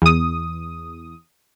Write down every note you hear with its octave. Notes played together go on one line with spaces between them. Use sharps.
E2 D#6